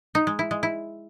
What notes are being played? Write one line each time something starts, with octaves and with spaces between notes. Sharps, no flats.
D#4
G#3
E4
G#3
E4